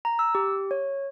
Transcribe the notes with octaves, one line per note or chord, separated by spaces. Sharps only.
A#5
E6
G4
C#5